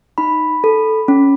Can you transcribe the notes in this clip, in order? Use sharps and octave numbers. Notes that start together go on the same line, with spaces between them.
D#4 B5
A4
C#4